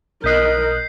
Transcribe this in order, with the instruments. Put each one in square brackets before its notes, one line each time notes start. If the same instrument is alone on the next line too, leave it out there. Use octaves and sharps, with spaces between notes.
[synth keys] B1 D#5 F#6 [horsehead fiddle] A#4 [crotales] G6 B6 C7